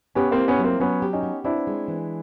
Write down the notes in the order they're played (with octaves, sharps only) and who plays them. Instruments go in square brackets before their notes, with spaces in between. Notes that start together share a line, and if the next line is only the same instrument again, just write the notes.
[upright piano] B3 C#4 [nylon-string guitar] G4
[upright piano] A#3 C4
[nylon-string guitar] E4
[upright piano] B3 C#4
[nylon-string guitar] F#3
[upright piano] A#3 C4
[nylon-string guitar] F#3 [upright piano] B3 C#4
[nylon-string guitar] G4
[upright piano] C#4 D#4
[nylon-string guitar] B3
[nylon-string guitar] C4 [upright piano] D4 E4
[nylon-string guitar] G#3
E3